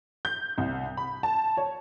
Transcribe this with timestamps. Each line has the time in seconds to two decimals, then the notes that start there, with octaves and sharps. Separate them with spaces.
0.25 G6
0.58 C2
0.97 B5
1.23 A5
1.57 C#5